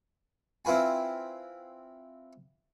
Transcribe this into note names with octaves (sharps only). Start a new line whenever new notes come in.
C4 E4 F4 B4 G#5